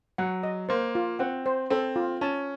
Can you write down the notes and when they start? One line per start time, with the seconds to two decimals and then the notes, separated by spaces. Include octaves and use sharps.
0.18 F#3 F#5
0.43 D#5
0.69 A#3 C5
0.95 F4
1.19 C4 F#5
1.46 C5
1.70 C4 A4
1.96 F4
2.21 C#4 A5